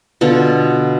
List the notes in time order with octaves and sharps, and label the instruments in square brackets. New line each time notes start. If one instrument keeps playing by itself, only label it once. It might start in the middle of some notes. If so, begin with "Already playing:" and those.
[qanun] B2 D3 F4 A4